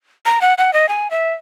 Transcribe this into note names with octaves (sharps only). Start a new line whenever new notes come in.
A#5
F#5
F#5
D#5
G#5
E5